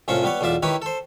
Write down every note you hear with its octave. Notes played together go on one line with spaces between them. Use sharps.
C2 A2 C#4 F4 C5 C#6
G3 B3 B4 C#5
B1 E2 F4 D5 E5
D#3 E4 G4 B4 C#5
A4 C5